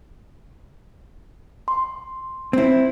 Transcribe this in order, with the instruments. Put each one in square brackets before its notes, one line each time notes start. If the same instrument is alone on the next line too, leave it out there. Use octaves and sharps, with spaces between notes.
[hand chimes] C6
[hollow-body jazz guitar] C4 E4